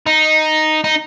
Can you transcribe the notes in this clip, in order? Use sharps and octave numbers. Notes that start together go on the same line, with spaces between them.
D#4
D#4